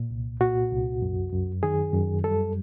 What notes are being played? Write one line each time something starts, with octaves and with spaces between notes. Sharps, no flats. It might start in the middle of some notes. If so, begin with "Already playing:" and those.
Already playing: A#2
C2
A#2 F#4
C2
F#2
F#2
D#3 G#4
F#2
G3 A4